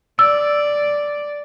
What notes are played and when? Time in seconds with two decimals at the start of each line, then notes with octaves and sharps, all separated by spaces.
0.19 D5 E6